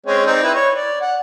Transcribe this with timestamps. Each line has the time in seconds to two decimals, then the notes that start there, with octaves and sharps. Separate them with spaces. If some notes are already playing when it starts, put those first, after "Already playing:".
0.07 G#3 C4 C#4
0.26 C4 D#4 D5
0.43 E4 B4
0.55 C#5
0.76 D5
1.01 F#5